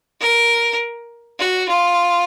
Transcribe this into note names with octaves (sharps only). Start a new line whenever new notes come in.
A#4
F#4
F4